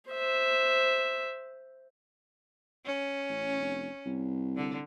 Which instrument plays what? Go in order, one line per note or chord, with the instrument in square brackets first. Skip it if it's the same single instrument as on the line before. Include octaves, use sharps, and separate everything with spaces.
[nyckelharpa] C5 E5
[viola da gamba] C#4
[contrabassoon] A1
F1
C2
[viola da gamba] D3